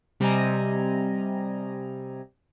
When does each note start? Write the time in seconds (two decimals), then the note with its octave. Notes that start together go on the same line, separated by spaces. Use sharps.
0.20 C3 G3 C4 D#5 G#5 A#5